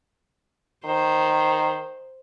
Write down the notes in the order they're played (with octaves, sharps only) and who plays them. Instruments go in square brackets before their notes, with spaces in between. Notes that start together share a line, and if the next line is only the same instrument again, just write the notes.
[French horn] D#3 [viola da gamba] C5